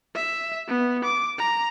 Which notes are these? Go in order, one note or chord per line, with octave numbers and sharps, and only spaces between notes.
E5
B3
D6
A#5